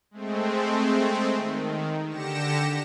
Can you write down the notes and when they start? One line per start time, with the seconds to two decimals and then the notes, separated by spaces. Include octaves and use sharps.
0.11 G#3 A3 C4
1.35 D#3
2.09 D3 G4 A#6 C#7 E7